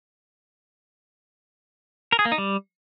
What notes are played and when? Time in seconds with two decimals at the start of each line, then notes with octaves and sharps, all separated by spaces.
2.12 A#4
2.19 G#4
2.25 A#3
2.32 D#4
2.38 G3